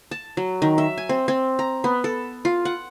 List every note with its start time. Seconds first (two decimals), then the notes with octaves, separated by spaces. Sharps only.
0.11 A5
0.37 F#3
0.62 D#3
0.78 E5
0.98 G#5
1.09 C4
1.28 C4
1.59 A#5
1.84 B3
2.04 A4
2.45 F4
2.65 F#5